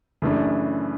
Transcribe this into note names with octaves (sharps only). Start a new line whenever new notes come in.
F#2 C#3 E3 A3 D4